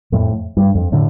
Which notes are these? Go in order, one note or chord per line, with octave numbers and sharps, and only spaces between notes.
F2 A2
G2
F2
A2 D3